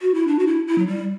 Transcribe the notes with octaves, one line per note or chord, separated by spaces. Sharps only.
F#4
E4
D4
F#4
E4
E4
F#3
G3